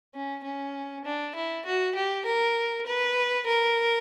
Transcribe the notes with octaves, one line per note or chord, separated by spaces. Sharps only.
C#4
C#4
D4
E4
F#4
G4
A#4
B4
A#4